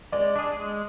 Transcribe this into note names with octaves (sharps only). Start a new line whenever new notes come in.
G#3 D5
D4 G#4
G#3